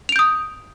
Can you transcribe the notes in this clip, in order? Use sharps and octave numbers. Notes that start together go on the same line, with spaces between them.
D#6 G6 D7 F7